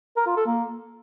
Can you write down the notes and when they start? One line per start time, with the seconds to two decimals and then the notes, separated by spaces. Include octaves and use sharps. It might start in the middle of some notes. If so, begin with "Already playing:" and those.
0.17 A#4
0.26 F4
0.36 A4
0.46 A#3